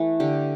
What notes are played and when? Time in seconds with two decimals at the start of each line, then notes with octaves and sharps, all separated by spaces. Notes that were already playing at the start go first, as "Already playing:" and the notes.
Already playing: E3 A3
0.20 D3 G4